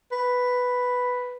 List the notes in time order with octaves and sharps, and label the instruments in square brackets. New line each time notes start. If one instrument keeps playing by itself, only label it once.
[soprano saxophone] B4